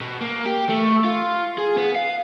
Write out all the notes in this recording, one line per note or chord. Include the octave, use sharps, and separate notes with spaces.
B2
A#3
G4
A3
F4
G#4
B3
F5